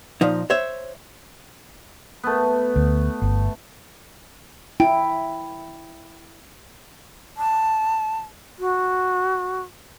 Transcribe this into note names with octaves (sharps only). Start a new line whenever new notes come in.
A#2 F3 D#4
C5 C#5 E5
A3 B3
D2
G1
E4 G5
A5
F#4